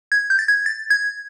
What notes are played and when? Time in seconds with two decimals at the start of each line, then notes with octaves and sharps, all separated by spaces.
0.12 G#6
0.30 G6
0.39 A6
0.48 G#6
0.66 A6
0.90 G#6